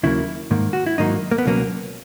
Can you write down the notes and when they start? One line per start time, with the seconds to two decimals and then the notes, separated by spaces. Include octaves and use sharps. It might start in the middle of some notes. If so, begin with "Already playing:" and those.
0.03 D#2 C#3 F#3 A#3 E4
0.51 G#2 D#3 A#3
0.73 F#4
0.86 E4
0.98 G#2 D#3 F#3 A#3 D#4
1.31 A#3
1.38 B3
1.46 C#2 B2 F#3 A#3 C#4